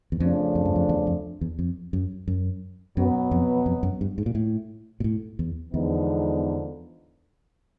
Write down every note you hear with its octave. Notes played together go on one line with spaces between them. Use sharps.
E2
F2 C#3 F3 A3 D4
F2
F#2
F2
E2
F2
E2
F2
F#2
F#2
F#2 B2 F#3 B3
F2
F2
F#2
G2
G#2
A#2
A2
A#2
A2
E2
E2 D3 F3 G#3 B3 D#4